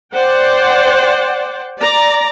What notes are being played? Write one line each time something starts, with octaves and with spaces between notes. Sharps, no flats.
C5 D5 F#5 G5
D5 A#5